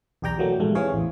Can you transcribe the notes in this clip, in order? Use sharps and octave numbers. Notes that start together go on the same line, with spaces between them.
B1 E2 G4 D5 G5 A#5
E3 F#3 A3 A#3
A#1 E2 G#2 G3 A3
E3 C4 G#4 C#5 F5
A1 E2